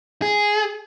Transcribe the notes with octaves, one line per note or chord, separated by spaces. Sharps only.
G#4